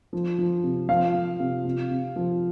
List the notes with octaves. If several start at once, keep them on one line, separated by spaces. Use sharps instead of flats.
F3
F3
C3
F3 F5
F3
C3
C3
C3
F3